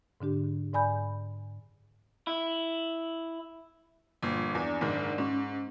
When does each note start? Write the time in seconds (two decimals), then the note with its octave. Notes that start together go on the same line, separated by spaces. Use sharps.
0.21 G#2 D3 D4 G4
0.73 G#2 D5 G#5 B5 G6
2.27 E4
4.23 G1 A#2 F3
4.55 E2 D4 D5
4.81 F#1 G#2 D#3
5.18 G#2 C#4